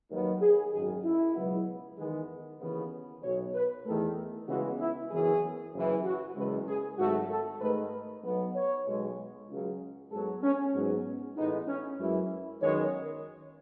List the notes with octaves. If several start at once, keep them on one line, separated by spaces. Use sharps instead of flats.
D#2 D#3 F#3 B3
G#4
G#1 F#2 D#3 G#4
E4
C#2 B2 F#3 B3
E2 D#3 G#3 B3 G#4
D#2 C#3 E3 B3
B1 B2 F#3 B3 C#5
B4
E2 D#3 A3 A4
C#2 C#3 E3 G#3 B3 F#4
E4
F#1 F#2 E3 B3 G#4
F#1 F#2 E3
F#4
F#1 E2 C#3 G#3 B4
G#4
G#1 G#2 F#3 A3 F#4
A4
G#2 D#3 A3 B4
B1 B2 F#3 B3
C#5
B1 B2 G#3
C#2 C#3 F#3
G#2 F#3 B3 A4
C#4
G#2 F#3 B3 C#4
A1 A2 G#3 B3 D#4
C#4
F#2 E3 G#3 E4
F#2 D#3 G#3 B3 C#5